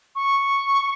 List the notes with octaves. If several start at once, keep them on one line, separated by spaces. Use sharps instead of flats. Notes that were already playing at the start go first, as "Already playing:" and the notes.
C#6